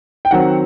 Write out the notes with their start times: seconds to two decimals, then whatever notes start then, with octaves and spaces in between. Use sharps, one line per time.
0.25 G5
0.31 D#3 F#3 C4 F#5